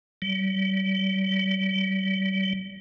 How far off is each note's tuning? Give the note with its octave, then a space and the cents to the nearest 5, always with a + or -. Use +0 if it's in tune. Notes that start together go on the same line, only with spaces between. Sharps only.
G3 -40